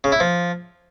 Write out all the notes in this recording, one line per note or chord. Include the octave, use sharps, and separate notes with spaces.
C#3
E4
F3